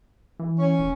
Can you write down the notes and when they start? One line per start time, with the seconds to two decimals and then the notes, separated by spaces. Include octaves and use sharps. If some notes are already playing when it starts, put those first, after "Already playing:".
0.40 E3
0.59 C#4
0.79 D#1